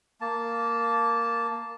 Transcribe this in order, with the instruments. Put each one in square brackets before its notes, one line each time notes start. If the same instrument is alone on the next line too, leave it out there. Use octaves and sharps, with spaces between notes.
[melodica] A#3 A5